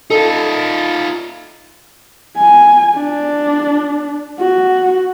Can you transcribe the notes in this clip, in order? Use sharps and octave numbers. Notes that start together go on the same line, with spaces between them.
D#4 F4 A4
G#5
D4
F#4